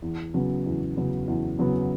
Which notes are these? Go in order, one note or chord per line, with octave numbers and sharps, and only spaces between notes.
E2
C#3 F#3 B3
E2
C#3 F#3 B3
E2
C#3 F#3 B3